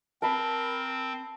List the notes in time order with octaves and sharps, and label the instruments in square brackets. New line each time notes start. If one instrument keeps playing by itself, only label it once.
[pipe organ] C4 [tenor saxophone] A#4 [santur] A5 B5